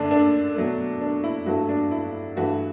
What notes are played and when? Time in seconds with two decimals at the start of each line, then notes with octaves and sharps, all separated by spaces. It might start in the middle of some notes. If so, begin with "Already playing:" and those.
Already playing: F#2 D3 A3 D4
0.11 D4
0.56 B2 F#3 A3
1.01 D4
1.24 E4
1.46 G2 F#3 A3 F#4
1.69 D4
1.91 E4
2.36 G2 E3 A3 F#4